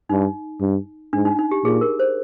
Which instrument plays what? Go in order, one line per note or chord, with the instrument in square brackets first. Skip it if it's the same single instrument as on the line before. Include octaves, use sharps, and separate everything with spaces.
[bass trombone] G2 [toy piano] D#4
[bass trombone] G2
[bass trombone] G#2 [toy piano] D4
[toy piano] D#4
D#4
G4
[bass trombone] A#2 [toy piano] G#4
[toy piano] A#4
C5